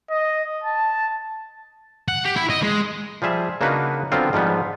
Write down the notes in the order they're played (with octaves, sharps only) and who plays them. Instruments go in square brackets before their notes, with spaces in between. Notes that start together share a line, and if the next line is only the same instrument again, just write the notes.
[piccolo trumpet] D#5
A5
[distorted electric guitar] F#5
G4
E4
D#5
G#3
[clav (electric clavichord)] F3 G3 G#4 E5
C#3 A#3 D4 D#4 F#4 B4
D3 F#3 B3 C4 F4
G#2 F3 G3 B3